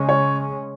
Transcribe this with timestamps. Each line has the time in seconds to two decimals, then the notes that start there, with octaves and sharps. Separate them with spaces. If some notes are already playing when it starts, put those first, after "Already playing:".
Already playing: C#3 G#3 C#4
0.09 C#5